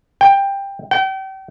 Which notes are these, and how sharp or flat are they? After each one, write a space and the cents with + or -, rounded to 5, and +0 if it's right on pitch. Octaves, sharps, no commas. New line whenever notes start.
G5 +15
G5 -35